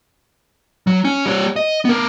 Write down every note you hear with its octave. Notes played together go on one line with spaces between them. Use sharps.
F#3
C#4
G3 C#5
D#5
B3 A#4